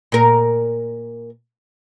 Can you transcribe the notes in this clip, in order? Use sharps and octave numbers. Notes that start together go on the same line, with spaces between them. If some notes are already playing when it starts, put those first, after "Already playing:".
A#2 A#4